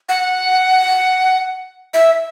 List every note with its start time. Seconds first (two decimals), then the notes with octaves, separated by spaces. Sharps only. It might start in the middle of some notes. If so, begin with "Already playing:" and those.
0.09 F#5
1.94 E5